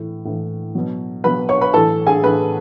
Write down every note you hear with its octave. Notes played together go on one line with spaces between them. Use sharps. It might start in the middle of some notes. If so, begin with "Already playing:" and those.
Already playing: A2 E3
A2 E3
B2 F#3
B2 F#3 B4 B5
C#5 C#6
B4 B5
A2 E3 A4 A5
G#4 G#5
A2 E3 B4 B5